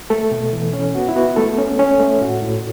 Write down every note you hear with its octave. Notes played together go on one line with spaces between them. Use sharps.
A3 A4
B2
E3
C#4
B3 F#4
E4
B3 F#4
A3 A4
C#4
C#4
A3
A2 F#4
A2